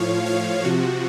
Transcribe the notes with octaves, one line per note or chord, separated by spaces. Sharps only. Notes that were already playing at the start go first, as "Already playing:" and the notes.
Already playing: A2 F3 C#5 F5
C#5 F5
C3 F3 F#4